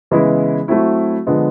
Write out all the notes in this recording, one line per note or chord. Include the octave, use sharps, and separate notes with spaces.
C#3 E3 G#3 B3 E4
F#3 A3 C4 E4
D3 F3 G#3 B3